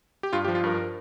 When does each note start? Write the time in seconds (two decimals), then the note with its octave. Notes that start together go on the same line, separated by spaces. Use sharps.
0.23 G4
0.33 G2 F4
0.45 G4
0.48 F3
0.55 F4
0.64 G2 A#4